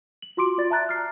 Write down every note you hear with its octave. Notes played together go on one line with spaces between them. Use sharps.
F#7
F4 F#4 C6 D6 D7
F4 D5 A6
E5 A5 A#5 F#6 A6
F6 C7